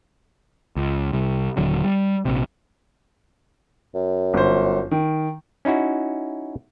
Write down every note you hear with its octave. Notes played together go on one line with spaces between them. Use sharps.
C#2
C2
D#1 D3 F#3
G3
A#1 C3
F#2
G1 C5
D#3
C#4 D#4 E4 F#4